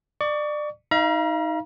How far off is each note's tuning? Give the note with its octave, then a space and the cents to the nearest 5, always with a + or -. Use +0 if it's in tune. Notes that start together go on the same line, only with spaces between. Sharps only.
D5 +25 C#6 +35
D#4 +15 F5 -30 A#5 +40